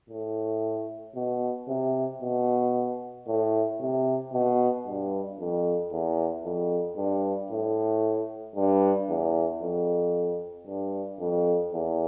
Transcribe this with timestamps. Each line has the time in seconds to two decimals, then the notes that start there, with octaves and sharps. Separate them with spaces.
0.10 A2
1.16 B2
1.69 C3
2.22 B2
3.28 A2
3.81 C3
4.33 B2
4.86 G2
5.40 F2
5.92 E2
6.45 F2
6.97 G2
7.51 A2
8.56 G2
9.09 E2
9.62 F2
10.67 G2
11.20 F2
11.73 E2